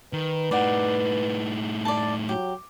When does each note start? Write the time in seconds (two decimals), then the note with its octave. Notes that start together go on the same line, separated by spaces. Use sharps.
0.13 D#3 B4
0.51 A2 D#4 D5 F#5
1.85 D5 A5
2.29 F#3 G4